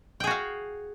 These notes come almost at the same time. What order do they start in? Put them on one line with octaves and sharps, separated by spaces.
G5 G#4 F#4 F5